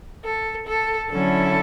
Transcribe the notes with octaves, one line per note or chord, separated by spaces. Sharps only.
A4
A4
D3 F#3 C#4 E4 A4